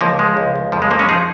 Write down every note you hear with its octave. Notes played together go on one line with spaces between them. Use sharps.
C#2 F3 A#3
F3 G#3
C#2
C#2
F2 F3
G#3
F2 F3 A#3
G#3 C#4
F3 D#4 G#4